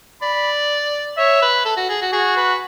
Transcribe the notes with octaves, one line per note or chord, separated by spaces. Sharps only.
D5 B5
C#5 E5
B4
A4
F#4
G#4
F#4
F#4 G#4
B4